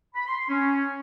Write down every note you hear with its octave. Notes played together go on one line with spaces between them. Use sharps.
B5
C6
C#4